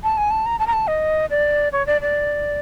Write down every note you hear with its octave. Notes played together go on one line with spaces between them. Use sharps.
A5
G#5
A5
A#5
A5
A#5
A5
D#5
D5
C#5
D5
D5